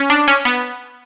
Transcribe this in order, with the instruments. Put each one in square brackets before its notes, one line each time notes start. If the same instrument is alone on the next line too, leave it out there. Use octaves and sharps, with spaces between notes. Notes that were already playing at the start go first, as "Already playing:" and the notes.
Already playing: [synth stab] C#4
D4
C#4
B3